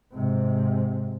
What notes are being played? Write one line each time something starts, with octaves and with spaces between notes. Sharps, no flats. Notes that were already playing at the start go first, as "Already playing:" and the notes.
G#2 C3